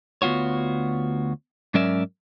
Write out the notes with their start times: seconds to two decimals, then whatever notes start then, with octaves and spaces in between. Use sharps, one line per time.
0.22 D2 B3 F4 F#4 C#5
1.74 G#2 F#3 C#4 A#4 D5 E5